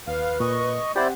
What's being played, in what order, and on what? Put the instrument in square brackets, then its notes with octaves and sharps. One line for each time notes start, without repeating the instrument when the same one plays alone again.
[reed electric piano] D#2 [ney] B4 [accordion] F5
[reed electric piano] A#2 [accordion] D#5 C#6
[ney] C4 [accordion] E4 C5 D5 [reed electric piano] G4 F#5